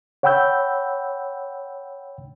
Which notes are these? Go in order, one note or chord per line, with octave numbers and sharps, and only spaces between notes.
C#5 F#5 G5 B5 E6 G6